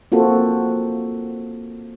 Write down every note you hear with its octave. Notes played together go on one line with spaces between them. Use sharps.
A#3 C4 F4 F#4 A4